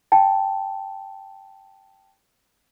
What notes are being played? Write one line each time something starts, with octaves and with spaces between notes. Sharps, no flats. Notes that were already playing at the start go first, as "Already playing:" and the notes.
G5 A5